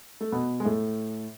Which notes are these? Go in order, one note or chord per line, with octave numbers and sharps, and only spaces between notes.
A3
B2 B3
G#3
A2 A3